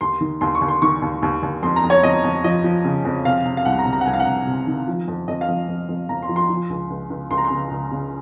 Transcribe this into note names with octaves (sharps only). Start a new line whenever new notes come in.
D#2 C6
D#3
D#2 C6
C#6
D#2
C6
D#3 C#6
D#2
D#2
D#2
F2 C6
A#5
F2
C#5
F2 D#5
F2
F3 D#5
F3
C#3
F2
C3 F5
C3
F5
C2 F#5
A#5
C3
A#5
F#5
C2 G#5
F5
F#5
C2
C3
D#3
F3
F2
F2 D#5
F5
F2
F2
F2
F2 A#5
C6
F3
C6
F3
C#2
C#2
C#2
C#2 C6
A#5
C6
C#3
C#2
C#3